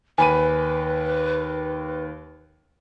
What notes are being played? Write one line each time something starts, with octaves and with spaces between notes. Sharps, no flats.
D#2 B4 G#5 B5 D#7